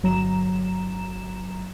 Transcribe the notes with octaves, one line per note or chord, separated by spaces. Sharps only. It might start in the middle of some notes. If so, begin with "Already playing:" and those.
G1 F#3 A#5 E7